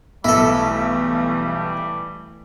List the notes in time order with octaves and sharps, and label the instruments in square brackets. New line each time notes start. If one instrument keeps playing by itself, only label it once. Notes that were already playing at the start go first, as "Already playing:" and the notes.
[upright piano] B1 [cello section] E3 A3 [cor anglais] G3 [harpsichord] E4 A4